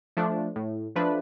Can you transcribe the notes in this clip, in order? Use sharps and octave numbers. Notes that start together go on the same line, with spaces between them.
F3 A3 D4
A2
F3 A3 D4 B4